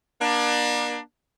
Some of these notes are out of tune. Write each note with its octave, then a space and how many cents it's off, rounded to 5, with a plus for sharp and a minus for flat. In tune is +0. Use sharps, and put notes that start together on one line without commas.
A#3 +40 D4 +25